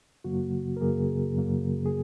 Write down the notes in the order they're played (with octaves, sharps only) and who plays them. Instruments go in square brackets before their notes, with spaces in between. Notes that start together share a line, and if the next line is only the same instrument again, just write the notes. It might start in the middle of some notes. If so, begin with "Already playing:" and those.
[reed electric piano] F#2 C#3 F#3 A#3 F#4
A#4
F#2 C#3 F#3 A#3 G#4
F#2 C#3 F#3 A#3
G#4